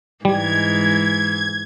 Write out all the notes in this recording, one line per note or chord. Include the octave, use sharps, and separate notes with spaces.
G#2 E3 G3 G#3 G#6